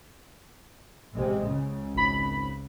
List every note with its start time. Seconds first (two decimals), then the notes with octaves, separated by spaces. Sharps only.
1.13 A1 C3 G#3
1.44 C#2 C#3
1.95 G#1 B5